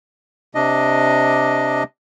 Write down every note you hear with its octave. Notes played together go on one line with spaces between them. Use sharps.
C3 D4 D#5